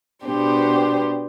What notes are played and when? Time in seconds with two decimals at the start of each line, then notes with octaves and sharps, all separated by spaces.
0.26 B2 B3 D4 G4 C5